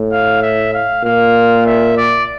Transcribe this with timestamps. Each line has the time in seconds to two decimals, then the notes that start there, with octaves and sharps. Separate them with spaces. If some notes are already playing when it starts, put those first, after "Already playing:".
Already playing: A2
0.12 F5
0.42 E5
0.73 F5
1.04 A#2 F5
1.66 E5
1.97 D5